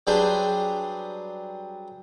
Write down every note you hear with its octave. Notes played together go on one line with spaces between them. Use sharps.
F#3 G3 D4 G#4 B4 C5